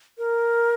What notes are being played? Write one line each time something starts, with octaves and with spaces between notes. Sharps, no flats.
A#4